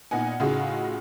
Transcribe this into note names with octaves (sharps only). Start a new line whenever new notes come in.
A#2 B3 D#4 F#5 G#5
A2 C#3 D#4 F4 F#4 G#4